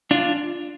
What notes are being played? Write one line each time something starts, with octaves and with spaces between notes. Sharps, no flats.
D4 F4